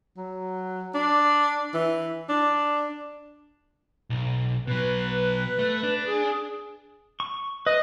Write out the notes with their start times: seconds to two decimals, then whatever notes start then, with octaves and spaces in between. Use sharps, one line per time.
0.17 F#3
0.94 D4
1.74 E3
2.29 D4
4.10 B1
4.67 B2 F#3 B4
5.59 A3
5.83 D4
6.07 G#4
7.20 C#6
7.66 B4 D#5